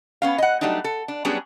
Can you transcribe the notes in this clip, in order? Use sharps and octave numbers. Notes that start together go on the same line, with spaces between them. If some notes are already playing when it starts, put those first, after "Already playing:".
B3 C#4 F5
D#5 F#5
F#3 G3 A3 D4 D#4
A4
D4
F#3 G3 B3 C#4 D4 G#4